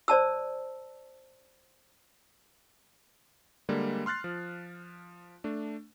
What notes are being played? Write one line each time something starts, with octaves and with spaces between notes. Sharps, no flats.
C5 D5 A5 E6
D3 G3 G#3 A#3
C6 F6 F#6 A6 C7
F3
A3 D4